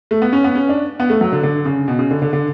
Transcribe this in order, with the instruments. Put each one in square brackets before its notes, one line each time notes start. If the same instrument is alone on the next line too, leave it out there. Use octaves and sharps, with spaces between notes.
[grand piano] A3
B3
C#4
B3
C#4
D4
B3
A3
F#3
D3
D3
C#3
B2
C#3
D3
D3
D3